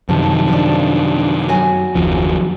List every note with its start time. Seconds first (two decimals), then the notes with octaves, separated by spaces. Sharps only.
0.09 F#2 C3 D#3 F3 A5
0.49 F3 D4
1.49 F#3 F#4 G#5
1.95 F#1 D#2 F3